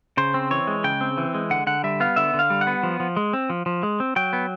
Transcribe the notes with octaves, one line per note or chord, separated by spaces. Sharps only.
C#3 C5
C4
E3 C#5
G#3
C#3 G5
C4
E3
G#3
D3 F#5
D3 F#5
G3 E5
B3 F5
D3 E5
D3 F5
G3
F#5
B3
F3
F3
G#3
C4
F3
F3
G#3
C4
F#3 G5
B3